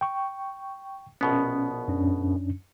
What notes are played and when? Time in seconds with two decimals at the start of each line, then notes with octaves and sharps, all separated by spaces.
0.01 G5 C#6
1.21 A#1 B2 B3 C#4
1.88 F#2 C#4 D4